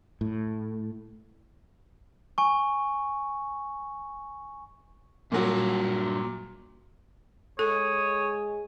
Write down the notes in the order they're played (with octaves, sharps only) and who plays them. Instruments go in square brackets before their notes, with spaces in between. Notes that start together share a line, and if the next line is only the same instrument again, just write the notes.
[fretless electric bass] A2
[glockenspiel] G#5 C#6
[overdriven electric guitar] G2 F#4 [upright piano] A#2 F#3
[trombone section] G#3 G#4 [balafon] A4 [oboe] C#5 [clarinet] D#6